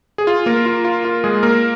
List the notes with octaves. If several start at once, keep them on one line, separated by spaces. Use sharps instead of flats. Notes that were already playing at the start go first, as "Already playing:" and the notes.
G#4
F4
A#3 A#4
F4
F4
F4
G#3 G#4
A#3 A#4